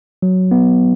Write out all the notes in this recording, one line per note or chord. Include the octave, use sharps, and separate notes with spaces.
F#3
B3